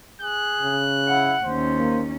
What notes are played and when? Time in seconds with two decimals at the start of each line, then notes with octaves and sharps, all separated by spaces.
0.22 G#4 F#6
0.62 C#3
1.08 E4 F#5
1.44 D#2 C#4 C5
1.80 A#3